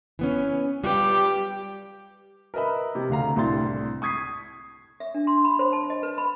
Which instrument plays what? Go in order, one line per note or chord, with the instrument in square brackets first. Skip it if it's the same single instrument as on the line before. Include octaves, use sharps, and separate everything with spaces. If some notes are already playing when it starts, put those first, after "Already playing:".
[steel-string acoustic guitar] E3 B3 C#4
[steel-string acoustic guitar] G3 F4 B4 [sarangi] G4
[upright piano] A#4 B4 D#5 E5 B5
C3
D2 D3 F5 A#5
C2 A2 D4 C6 A6
C#6 D#6 G#6 B6 C7
[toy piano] E5
D4
C6
B5
C5
A5
D#5
B4
B5